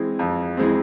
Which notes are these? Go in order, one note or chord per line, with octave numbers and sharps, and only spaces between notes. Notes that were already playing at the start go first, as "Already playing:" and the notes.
Already playing: E3 G#3 C4
F2
E3 G#3 C4